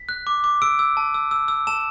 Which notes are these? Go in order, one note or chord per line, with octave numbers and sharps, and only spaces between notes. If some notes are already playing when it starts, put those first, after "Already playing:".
Already playing: B6
F#6
D6
D6
E6 D7
E6
A5
E6
E6
E6
A5 E7